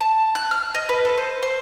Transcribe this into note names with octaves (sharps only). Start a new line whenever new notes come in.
A5
F#6
F6
D#5
B4
A4
C5
C5